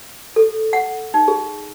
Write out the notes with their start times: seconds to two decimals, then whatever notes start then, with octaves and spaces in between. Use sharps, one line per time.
0.36 A4
0.73 F#5
1.14 D#4
1.28 G#4